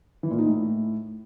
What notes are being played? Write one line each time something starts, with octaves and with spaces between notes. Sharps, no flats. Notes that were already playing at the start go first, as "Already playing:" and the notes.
E3
A#2
D#4
A2